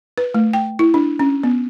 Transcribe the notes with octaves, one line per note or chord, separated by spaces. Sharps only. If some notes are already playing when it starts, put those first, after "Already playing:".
B4
A3
G5
E4
D4
C#4
B3